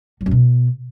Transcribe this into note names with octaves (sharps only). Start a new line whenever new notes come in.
F#3
F#2
B2